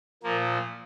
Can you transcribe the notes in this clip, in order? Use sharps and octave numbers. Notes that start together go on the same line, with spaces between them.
A#2 F3 A#3